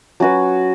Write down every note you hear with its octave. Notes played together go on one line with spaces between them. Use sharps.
F#3 C#4 F#4 B4